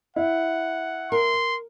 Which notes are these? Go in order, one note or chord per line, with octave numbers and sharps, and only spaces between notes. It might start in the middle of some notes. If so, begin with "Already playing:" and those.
E4 F#5
A#4 C6